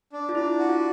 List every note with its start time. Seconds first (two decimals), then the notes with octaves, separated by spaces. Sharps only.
0.13 D4
0.29 F4
0.35 D4 E4
0.58 F#4
0.69 F4